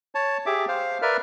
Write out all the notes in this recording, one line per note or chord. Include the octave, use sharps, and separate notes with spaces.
C#5 A5
G4 G#4 E5 D6
C5 F5
A#4 B4 D5 E5 F6